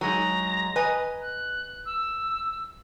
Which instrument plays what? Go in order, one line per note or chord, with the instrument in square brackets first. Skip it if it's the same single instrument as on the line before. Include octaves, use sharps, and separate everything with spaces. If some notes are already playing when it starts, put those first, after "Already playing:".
[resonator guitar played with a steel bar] F#3 G#3 D#4 [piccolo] A#5
[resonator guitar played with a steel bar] B4 D#5 G#5
[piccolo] F#6
E6